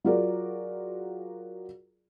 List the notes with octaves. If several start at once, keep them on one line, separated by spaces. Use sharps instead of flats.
F#3 F4 F#4 G#4 A#4 D5